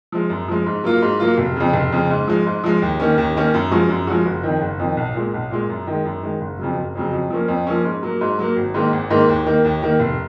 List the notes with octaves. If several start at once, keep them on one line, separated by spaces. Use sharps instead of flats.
F3 G#3
F#2
F3 G#3
G#2
F#3 A#3 F4
G#2
F#3 A#3 F4
F1
F2 C#3
F1
F2 C#3
G#2
F3 G#3
G#2
F3 G#3
D#2
D#3 A#3 C#4
D#2
D#3 A#3 C#4
F#2
F3 G#3 C#4 F#4
F#2
F3 G#3 C#4 F#4
F#1
F2 D#3
F#1
F2 D#3
B1
A#2 G#3
B1
A#2 G#3
F#2
D#3 G#3
F#2
D#3 G#3
F#1
F2 C#3 F#3
F#1
F2 C#3 F#3
F2
F3 A#3 C#4
F2
F3 A#3 C#4
G#2
F#3 A#3
G#2
F#3 A#3
G#1
G#2 D#3 A#3
G#1
G#2 D#3 A#3
D#2
D#3 A#3
D#2
D#3 A#3
F1